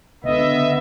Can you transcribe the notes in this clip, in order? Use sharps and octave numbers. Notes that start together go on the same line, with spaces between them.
C#2 D3 B3 D#5 E5